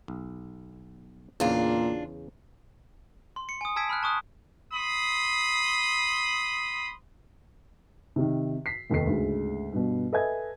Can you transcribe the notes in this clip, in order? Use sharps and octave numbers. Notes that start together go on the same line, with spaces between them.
B1
E2 A#2 C#3 D4 F4
C6
C#7
G#5 D#6
G#5 A5 E6 G#6 B6 D7
B5 F6 F#6
A5 C#6 D#6 F#6
B5 C6 D#6
C3 D#3
B6 C7
F1 D#2 D#3 A4 C7
D2 G#2 C#3
G2 B2
A4 B4 D#5 E5 G#5 G#6